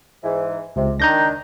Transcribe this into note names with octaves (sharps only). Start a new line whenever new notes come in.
G#2 E3
C#2 C3
D#3 D4 A#5 G6 A#6